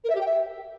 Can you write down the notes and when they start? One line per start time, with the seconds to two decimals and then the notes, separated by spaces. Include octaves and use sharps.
0.04 A#4
0.09 E5
0.14 G4
0.20 G5
0.25 E5